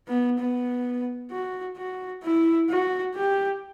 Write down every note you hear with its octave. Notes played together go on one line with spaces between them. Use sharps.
B3
B3
F#4
F#4
E4
F#4
G4